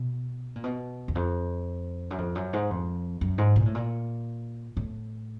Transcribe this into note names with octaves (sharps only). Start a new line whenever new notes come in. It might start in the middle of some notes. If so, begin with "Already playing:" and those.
Already playing: B2
A#2
B2
E2
F2
F#2
F2
F#2
G#2
F2
F#2
G#2
A#2
A2
A#2
A2